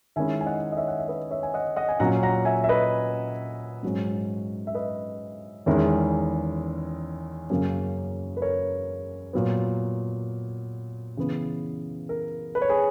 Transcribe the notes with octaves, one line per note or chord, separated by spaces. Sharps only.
D#3 G#3 C#4 E4 E5 G#5
G#5
D#5 F#5
D#5
C#5 E5
F#5
E5
B4 D#5
C#5 E5
G#5
D#5 F#5
D#5 F#5
G#5
A#2 F#3 C#4 F#5 A#5
F#5 A#5
E5 G#5
E5
B4 D#5
G#2 F#3 C#4
E5
B4 D#5
E2 D#3 G#3 C#4 E4
F#2 C#3 F#3 A#3 C#4
B4
A#4 C#5
A#2 F#3 B3
C#3 E3 B3
A#4
B4
C#5
G#4 B4